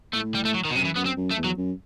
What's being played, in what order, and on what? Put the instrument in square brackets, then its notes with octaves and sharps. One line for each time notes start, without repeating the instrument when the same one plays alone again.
[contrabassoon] A2 [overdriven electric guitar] A3
[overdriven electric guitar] G3
A3
F#3
D#3
B2
[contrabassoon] F#2 [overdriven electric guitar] C3
[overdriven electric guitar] E3
[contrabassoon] F#2 [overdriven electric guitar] B3
[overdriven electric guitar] C4
[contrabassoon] F#2
[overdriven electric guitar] A3
[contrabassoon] E2
[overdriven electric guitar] F#3
[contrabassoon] F#2